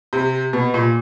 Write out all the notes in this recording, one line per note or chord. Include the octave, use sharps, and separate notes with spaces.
C3
B2
A#2